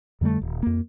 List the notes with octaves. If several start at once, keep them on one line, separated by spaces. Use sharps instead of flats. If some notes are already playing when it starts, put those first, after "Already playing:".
F2 D3 G3 A3
D#1
F2 A#3